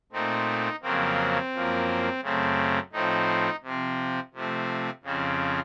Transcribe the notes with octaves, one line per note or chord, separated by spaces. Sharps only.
A#2 A3 C4 D#4
F2 C#3 F#3 A#3 C4
F#2 F3 A#3
F#2 C#3 A3 C4
A2 F3 C4 D#4
C3 F3 C4
C3 F3 A3 C4
F2 C#3 F3 C4